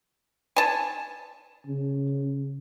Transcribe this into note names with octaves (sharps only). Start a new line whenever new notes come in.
G#5 A5
C#3